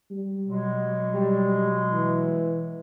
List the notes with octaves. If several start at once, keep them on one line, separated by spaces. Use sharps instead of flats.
G3
B2 F#3 G#3
G3
E3